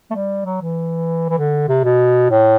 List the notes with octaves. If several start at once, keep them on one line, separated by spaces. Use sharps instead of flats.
A3
G3
F#3
E3
E3
D3
C3
B2
A2